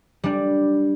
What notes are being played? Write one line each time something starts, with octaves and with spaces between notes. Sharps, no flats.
G3 D4